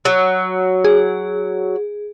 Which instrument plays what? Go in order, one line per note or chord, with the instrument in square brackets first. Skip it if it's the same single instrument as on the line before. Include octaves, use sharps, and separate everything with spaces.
[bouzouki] F#3
[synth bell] G#4